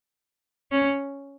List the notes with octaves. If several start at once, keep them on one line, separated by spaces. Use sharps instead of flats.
C#4